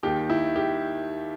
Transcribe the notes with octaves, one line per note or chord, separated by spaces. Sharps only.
D#2 D#3 G4
E4
G4